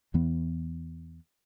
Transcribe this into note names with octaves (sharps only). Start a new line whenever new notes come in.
E2 E3 B3